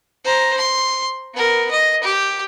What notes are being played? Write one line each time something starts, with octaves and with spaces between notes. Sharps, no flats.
C5 A#5
C6
B3 A#4
D#5
G4